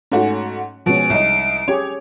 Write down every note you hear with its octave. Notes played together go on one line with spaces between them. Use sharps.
G#2 A3 C#4 F#4
B2 F3 G#3 C#4 D7
C2 D#4
C#4 G4 G#4 C#5